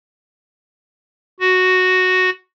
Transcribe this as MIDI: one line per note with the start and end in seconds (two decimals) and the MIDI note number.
1.40 2.30 66